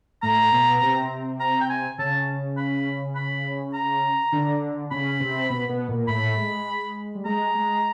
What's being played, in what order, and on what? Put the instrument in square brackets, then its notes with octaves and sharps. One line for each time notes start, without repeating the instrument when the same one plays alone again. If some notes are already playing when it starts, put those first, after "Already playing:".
[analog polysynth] A2 A3 [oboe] A#5
[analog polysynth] B2 B3
C3 C4
[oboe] A#5
G5
G#5
[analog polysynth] C#3 C#4 [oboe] A5
[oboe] B5
B5
A#5
[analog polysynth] D3 D4
[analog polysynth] C#3 C#4 [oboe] B5
[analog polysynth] C3 C4
B2 B3
B2 B3
A#2 A#3
[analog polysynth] A2 A3 [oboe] B5
[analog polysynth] G#3
G3
[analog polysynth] G#3 [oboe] A#5
[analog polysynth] G#3